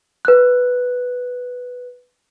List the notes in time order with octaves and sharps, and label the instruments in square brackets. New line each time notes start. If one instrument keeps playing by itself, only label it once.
[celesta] B4 F#6